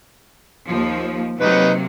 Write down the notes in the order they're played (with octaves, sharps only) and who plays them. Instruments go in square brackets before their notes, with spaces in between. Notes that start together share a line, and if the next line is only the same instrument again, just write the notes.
[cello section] D#2 F3
[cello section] C3 F#3 A#3 [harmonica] D#4 B4